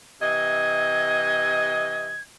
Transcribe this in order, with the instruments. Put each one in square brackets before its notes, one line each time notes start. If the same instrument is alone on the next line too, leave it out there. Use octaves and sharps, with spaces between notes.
[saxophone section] C3 E3 D#5 [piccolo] G#6